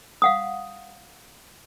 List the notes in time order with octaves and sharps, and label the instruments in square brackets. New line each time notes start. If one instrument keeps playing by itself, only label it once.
[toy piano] F5 F#5 D#6